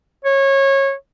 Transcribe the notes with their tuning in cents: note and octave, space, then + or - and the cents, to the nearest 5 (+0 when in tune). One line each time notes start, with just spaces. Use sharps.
C#5 -20